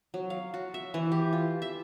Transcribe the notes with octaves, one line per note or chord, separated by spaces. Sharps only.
F#3
F5
F#4
E5
E3
G4
F4
E5